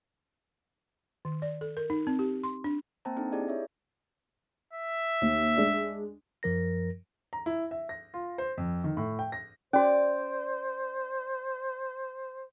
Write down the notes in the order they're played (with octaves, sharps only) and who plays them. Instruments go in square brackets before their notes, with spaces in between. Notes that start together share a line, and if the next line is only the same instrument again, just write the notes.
[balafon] D#3
D5
A4
A#4
D#4
C4
G4
C6
D4
[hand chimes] A#3 C4 C5 G5 A5 A#5
C4 D4 D#4 A4
E4 G4 G#4 D5 D#5
C#5 E5
[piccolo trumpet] E5
[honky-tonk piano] D#2
G#3 D4
[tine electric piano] F#2 F3 A#4 A#6
[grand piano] A#5
E4
E5
A#6
F4
C5
F2
D#3
A2
G5
A#6
[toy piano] C#4 F#4 [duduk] C5 [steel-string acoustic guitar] D5